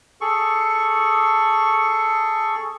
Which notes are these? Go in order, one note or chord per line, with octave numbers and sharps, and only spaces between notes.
G#4 A4 C#6